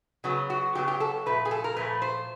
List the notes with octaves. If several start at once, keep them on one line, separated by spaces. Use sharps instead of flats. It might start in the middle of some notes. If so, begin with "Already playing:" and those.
C#3 F#3 B3
F#4
C#3 F#3 B3 G4
G4
A4
A#2 F3 A3 B4
G#4
A4
A#4
A#2 F3 A3 B4
C5